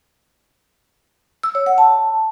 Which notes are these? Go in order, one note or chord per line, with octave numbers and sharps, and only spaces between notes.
E6
C#5
F#5
A5